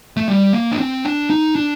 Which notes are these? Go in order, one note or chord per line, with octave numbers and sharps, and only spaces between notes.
A3
G3
A#3
D4
C4
D4
D#4
D4